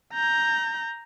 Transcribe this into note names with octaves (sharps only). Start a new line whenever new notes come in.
A#5 G6